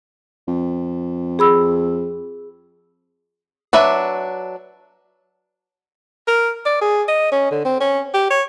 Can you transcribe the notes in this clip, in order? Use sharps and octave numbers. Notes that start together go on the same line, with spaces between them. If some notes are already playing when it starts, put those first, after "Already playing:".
F2
G#4 B5 E6
F#3 D4 B4 E5
A#4
D5
G#4
D#5
C#4
D3
C4
C#4
G4
C#5